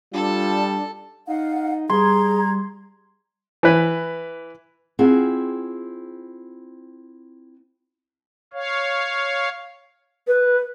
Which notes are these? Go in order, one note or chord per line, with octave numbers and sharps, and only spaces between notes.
G3 D4 F4 A4 A5
D#4 F5 F#5
G3 G#4 A#5 C6 G#6
E3 B4
C4 E4 F4 G#4 D#5 F#5
C#5 F5
B4